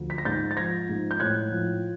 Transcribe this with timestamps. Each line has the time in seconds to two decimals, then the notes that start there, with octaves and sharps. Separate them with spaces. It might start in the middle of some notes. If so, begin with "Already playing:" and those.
Already playing: D2 F3
0.10 B6
0.18 A#6
0.25 G#2 G6 A6
0.51 A6
0.57 F3 G#6 A#6
0.89 G#2
1.11 G6
1.20 A2 F#6 G#6
1.52 F3